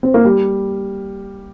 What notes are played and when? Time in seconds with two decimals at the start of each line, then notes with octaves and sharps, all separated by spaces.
0.03 C4
0.14 A#3
0.25 G3